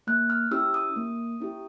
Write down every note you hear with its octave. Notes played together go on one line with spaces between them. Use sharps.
A#3 F#6
F6
C#4 E4 G4 E6
D#6
A#3
C#4 E4 G4